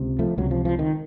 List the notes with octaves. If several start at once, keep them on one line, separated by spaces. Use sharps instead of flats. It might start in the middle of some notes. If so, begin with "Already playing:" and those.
Already playing: C#2 C3
F3 A3
C#2 C3 D#3 F#3
F3
F3
D#3